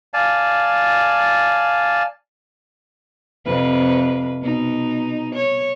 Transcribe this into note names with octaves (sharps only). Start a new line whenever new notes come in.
D5 F5 G#5 A5
F2 C3 B4
B2 D#4
C#5